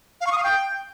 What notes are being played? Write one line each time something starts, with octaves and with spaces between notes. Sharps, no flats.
F5
C#6
D#6
F5
G5